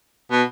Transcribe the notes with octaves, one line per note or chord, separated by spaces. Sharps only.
B2